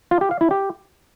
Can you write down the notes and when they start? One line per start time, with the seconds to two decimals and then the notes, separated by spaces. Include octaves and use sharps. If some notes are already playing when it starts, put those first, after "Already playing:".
0.11 F4
0.21 G4
0.31 F5
0.41 E4
0.51 G4